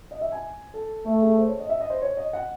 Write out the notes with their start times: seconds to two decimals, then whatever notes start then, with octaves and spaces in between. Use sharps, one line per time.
0.11 D#5
0.21 E5
0.32 G#5
0.74 A4
1.06 A3 A4
1.22 G#4
1.38 C5
1.48 C#5
1.59 D#5
1.69 E5
1.81 D#5
1.90 C5
2.02 C#5
2.17 D#5
2.33 F#5